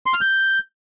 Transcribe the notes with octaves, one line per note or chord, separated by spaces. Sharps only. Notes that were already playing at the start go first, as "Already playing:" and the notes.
C6
F6
G6